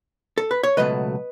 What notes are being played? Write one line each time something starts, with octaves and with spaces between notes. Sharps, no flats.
A4
B4
C#5
C#2 B2 F#3 A3 B4 D#5